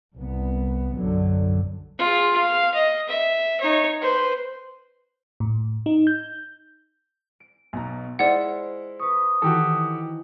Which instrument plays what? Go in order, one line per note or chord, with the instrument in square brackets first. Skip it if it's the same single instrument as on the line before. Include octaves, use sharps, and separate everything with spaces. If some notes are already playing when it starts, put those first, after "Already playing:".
[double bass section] C2 B3
B1 F#2 D3 F#3
[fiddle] F4 G#4
F5
D#5
E5
D#4 C#5
B4 C5
[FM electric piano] A2
D#4
G6
[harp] D7
[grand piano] B1 B2 A#5
[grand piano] G#3 E4 [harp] F4 C5 [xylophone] D5 F#5
[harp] B4 C#6 [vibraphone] D#6
[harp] D#3 E3 E4 [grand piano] F#4 G4 A4